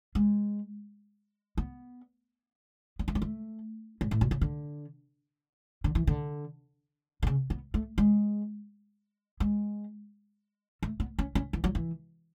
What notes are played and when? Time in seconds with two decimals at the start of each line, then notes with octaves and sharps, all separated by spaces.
0.15 G#3
1.57 B3
2.99 B3
3.08 A3
3.15 G#3
3.22 A3
4.01 G#2
4.11 A2
4.21 B2
4.31 C#3
4.41 D3
5.84 D3
5.95 E3
6.07 D3
7.23 D3
7.27 C#3
7.50 B3
7.74 A3
7.98 G#3
9.40 G#3
10.83 A3
11.00 B3
11.19 C#4
11.35 C#4
11.53 E3
11.64 F#3
11.75 E3